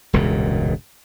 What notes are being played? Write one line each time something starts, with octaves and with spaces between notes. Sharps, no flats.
E1 C#2 G2 A#2